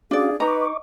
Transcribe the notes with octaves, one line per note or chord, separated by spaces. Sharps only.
C#4 D4 F#4 G#4 D5 F5
D#4 B4 D#5 A#5 C#6 D6